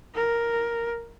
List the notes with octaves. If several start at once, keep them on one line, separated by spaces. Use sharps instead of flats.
A#4